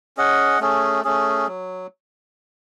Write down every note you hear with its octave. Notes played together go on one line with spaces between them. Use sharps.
C#4 G#4 D#5 F#5
A3 C#4 G#4
A3 C#4 G#4
F#3